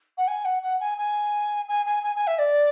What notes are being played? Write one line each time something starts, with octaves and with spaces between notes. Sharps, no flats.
F#5
G#5
F#5
F#5
G#5
G#5
G#5
G#5
G#5
G#5
E5
D5